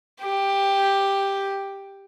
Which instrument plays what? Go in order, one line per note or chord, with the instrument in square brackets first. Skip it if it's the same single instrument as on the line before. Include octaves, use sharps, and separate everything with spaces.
[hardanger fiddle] G4